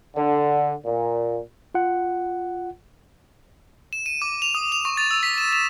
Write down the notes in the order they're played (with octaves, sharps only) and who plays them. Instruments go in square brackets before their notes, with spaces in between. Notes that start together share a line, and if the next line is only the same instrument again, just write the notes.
[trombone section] D3
A#2
[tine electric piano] F4 F#5
[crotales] E7
D#7
D6
F7
D#6
F7
C#6
A6
E6
B6
E7
E7